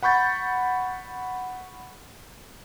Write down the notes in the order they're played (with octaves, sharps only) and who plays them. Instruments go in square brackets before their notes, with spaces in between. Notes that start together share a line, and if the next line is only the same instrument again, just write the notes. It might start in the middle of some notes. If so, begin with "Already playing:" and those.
[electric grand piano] F#5 B5 C#6 G6 A6